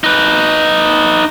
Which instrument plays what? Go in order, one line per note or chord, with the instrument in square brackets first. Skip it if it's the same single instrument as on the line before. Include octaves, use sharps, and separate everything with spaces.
[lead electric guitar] D#4 B4